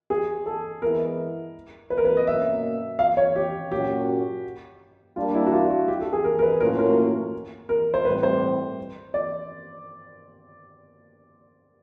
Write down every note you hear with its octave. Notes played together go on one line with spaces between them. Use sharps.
G#4
A4
E3 G#3 B3 E4 A#4
B4
A#4
B4
D#5
B2 F#3 A#3 C#4 E5
F5
C#5
G4
A#2 F#3 A#3 C#4 F#4 G4
G3 A#3 D4 F4
E4
F#4
F4
F#4
G4
A4
G#4
A#4
A#4
B4
A2 F#3 A#3 C#4 F4 A#4
A#4
A#4
C5
A2 E3 G3 C4 B4
C5
D5